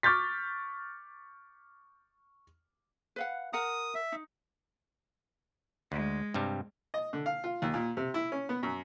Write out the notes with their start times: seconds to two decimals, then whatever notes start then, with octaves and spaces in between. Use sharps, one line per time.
0.03 C#6 D6 F6 G6 A6 B6
3.16 B4 F5 F#5
3.53 A#4 F#5 A#5 D#6
3.95 E5
4.12 D#4
5.92 D2 G#3
6.34 G2 C3 G3
6.94 D#5
7.13 D3
7.26 F5
7.44 F4
7.62 D#2
7.74 A#2
7.97 C3
8.14 E4
8.32 C#4
8.49 B3
8.63 F#2